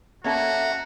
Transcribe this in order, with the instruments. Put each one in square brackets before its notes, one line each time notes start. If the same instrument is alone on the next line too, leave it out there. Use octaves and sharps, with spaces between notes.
[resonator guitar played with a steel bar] A#3 C#4 A4 [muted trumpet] F#4 [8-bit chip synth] E5 F#5 A#5